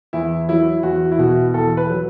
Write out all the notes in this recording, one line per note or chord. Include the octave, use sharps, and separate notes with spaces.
E2 E4
F#3 E4
E2 F#4
E4
B2 F#4
E2 A4
B4
F#3